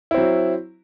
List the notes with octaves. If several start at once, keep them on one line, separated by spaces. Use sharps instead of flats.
F#3 C4 E4